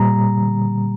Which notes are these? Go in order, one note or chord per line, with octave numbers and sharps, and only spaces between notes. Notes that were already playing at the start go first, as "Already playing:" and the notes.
Already playing: A#2 G3 A#5